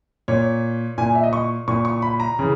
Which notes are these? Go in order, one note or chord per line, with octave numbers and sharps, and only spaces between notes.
A#2 C#5
A#2 G#5
E5
D#5
C#6
A#2 C#6
C#6
B5
A#5
C#3 E3